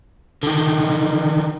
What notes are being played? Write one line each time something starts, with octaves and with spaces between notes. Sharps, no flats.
D3 D#3